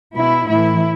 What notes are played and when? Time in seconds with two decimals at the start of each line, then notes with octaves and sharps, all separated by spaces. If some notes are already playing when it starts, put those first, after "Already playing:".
0.16 B2 E4
0.49 A2 E3 E4